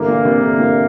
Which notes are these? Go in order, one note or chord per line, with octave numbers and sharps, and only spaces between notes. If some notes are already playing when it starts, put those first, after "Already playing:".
Already playing: G2 D3 E3 A#3
A#2
C3
D3
A#2